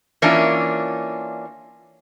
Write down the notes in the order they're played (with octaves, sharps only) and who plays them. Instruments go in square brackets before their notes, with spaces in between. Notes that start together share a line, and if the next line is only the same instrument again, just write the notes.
[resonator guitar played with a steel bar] E3 A#3 C#4 D4 F4